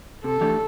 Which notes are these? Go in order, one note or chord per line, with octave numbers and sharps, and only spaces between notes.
C3 A4
E3 A3 D4 G4